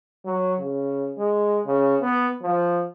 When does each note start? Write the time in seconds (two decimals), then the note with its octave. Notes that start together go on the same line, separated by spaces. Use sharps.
0.26 F#3
0.60 C#3
1.18 G#3
1.66 C#3
2.02 B3
2.42 F3